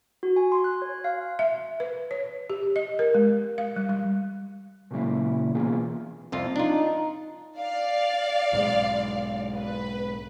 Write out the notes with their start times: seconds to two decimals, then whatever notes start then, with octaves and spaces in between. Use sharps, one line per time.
0.23 F#4
0.36 G#5
0.52 C6
0.64 F#6
0.82 C#5
1.04 F5
1.39 E5
1.80 B4
2.11 C#5
2.50 G4
2.76 D#5
2.99 A#4
3.15 G#3
3.58 F5
3.76 G3
3.89 G3
4.91 A#2 C#3 F#3 A#3 E4
5.54 B2 E3 A#3 B3 F4 G#4
6.32 C2 F2 F4
6.56 D4 D#4 F4
7.58 D5 F5
8.52 B1 G#2 G#3
9.55 B4